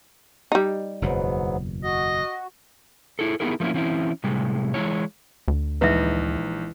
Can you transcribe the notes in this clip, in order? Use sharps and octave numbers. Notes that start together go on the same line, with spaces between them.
G3 D#4
F#1 E2 G#2 B2 F#3 B3
F#4 D#5
E4 G#4 A4
B3 D#4 E4 G4 G#4 A#4
F3 A3 A#3 C#4 E4
E3 C4 C#4 E4
A2 C3 G3 G#3
E3 G#3 D4 E4 C#5
D2
A#1 E3 G#3 D#4 B4 E5 A#5